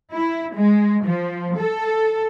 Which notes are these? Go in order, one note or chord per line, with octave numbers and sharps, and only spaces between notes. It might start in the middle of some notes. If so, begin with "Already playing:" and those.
E4
G#3
F3
A4